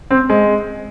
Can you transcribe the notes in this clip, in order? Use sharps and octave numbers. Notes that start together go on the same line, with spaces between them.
C4
G#3